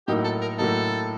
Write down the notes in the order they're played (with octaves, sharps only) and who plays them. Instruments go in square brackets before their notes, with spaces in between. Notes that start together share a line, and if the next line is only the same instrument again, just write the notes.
[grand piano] A2 F#3 A#3 D#4 [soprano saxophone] G4
[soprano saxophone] A4
A#4
[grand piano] A2 F#3 A#3 D#4 [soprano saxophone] A4